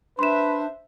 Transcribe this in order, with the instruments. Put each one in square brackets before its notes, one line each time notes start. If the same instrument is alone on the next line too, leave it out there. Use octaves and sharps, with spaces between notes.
[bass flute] D4 [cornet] B4 [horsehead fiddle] C5 E5 [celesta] C6 E7